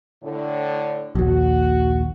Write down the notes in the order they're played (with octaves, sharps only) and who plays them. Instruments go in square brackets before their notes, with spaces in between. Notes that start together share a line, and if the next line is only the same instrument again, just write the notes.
[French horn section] A2 D3
[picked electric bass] A#1 D#2 [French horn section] F#4